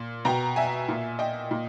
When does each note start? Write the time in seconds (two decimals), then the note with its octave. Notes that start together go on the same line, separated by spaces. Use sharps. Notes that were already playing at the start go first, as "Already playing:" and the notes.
Already playing: A#2
0.25 B2 G5 A#5
0.56 E5 G#5
0.88 A#2
1.19 D#5 G5
1.51 A#2